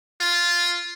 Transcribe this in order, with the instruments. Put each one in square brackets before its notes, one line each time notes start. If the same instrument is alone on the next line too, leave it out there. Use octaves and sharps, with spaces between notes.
[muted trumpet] F4